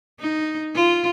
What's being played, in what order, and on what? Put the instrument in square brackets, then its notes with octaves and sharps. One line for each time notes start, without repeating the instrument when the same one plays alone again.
[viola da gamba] D#4
F4